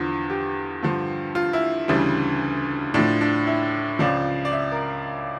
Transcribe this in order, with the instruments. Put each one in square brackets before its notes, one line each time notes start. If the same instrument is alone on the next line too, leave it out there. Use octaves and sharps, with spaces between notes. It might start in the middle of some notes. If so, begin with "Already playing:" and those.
Already playing: [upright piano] E2 D3 F3 F4
G4
G2 D3 F3
F4
E4
D2 C#3 E3 G3
A2 F3 D4
D4
E4
C#2 C#3 F3 D5
D5
E5
A#4